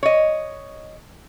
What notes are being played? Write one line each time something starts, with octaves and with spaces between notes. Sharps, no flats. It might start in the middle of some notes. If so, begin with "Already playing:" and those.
C#5 D#5